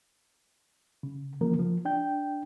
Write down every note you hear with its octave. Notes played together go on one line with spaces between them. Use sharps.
C#3
C#3 E3 F3 A#3 A#4
F3
D4 G5 G6